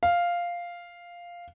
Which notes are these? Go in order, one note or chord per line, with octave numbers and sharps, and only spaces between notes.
F5